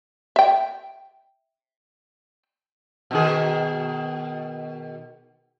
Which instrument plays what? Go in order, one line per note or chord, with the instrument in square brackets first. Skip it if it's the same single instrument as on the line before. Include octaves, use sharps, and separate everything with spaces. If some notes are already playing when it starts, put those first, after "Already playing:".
[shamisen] E5 G5
[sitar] B2 D#3 G#4